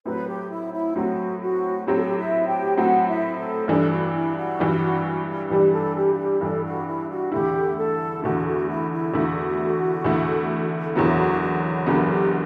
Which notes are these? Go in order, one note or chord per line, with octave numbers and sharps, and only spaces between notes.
A2 F#3 C4 B4
G4
E4
E4
A2 F#3 C4 F#4
F#4
A2 F#3 C4 G4
A4
G4
E4 E5
G4 G5
A2 F#3 C4 F#4 F#5
E4 E5
A4
G2 E3 G3 D4 A4
F#4
E4
F#4
G2 E3 G3 D4
G2 E3 G3 D4 G4
A4
G4
F#4
G4
G2 E3 G3 D4 A4
F#4
E4
F#4
E2 D3 A3 E4 G4
A4
E2 D3 A3 E4 F#4
F#4
E4
E4
E2 D3 A3 E4 F#4
E2 D3 A3 E4
F#1 E2 D3 F#3 B3 E4
F#4
F#4
F#4
F#1 E2 D3 F#3 B3 G4
G4